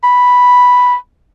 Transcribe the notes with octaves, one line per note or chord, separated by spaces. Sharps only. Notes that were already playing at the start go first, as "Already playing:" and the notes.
B5